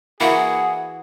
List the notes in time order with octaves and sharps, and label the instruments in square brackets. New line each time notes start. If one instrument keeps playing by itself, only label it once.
[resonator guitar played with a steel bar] E3 F#4 [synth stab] A#3 E4 [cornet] G#4 [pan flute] F#5